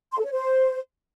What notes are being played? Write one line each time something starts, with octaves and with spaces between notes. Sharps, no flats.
C6
A4
C#5
C5